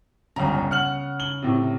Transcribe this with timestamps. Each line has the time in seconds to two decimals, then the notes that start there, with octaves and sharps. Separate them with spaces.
0.36 G1 C#2 C#3 A#5
0.71 F#5 F6 F#7
1.20 F#7 G7
1.42 A2 C3